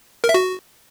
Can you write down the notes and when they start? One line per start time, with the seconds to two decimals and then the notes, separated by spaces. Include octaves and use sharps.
0.24 A#4
0.29 E5
0.34 F#4